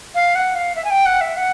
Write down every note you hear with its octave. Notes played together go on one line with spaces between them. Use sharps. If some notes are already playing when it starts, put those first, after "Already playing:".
F5
F#5
F5
E5
G#5
G5
F#5
E5
F#5